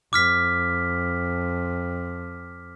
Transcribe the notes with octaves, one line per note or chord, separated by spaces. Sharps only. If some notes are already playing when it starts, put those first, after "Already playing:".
F2 D6 F6 B6